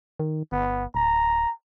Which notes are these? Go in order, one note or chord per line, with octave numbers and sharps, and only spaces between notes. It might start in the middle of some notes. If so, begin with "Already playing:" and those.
D#3
G1 B3
D1 A#5